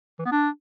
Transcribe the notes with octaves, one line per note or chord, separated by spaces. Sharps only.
E3
B3
D4